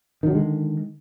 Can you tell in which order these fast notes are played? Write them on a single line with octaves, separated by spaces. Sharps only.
D#3 F#3 D3 G#3